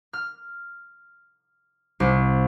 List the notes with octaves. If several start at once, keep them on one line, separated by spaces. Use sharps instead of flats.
F6
C2